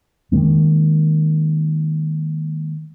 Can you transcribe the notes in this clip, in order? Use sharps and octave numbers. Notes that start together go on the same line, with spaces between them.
D#3 F#3 G#3 A#3